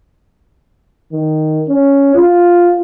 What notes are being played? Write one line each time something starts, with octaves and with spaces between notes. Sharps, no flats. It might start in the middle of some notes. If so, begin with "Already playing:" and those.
D#3
C#4
F4